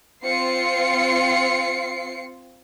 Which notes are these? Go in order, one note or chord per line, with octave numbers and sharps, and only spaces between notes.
C4 F4 C7 C#7